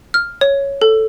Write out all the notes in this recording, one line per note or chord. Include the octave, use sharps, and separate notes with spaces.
F6
C#5
A4